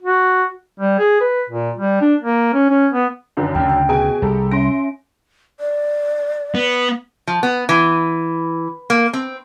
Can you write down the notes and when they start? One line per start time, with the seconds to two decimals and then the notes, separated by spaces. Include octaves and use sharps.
0.02 F#4
0.80 G3
0.99 G#4
1.21 B4
1.50 A#2
1.78 G3
2.01 D4
2.22 A#3
2.54 C#4
2.70 C#4
2.93 B3
3.37 F#2 D3 D#3
3.55 D2 C#3 G5
3.69 G5
3.89 B2 G#4 G#5 D7
4.22 C2 G4 A4 A#5
4.52 C#4 E5 C6 A#6 D7
5.60 D5
6.55 B3
7.27 F3
7.43 B3
7.69 E3
8.90 A#3
9.13 C4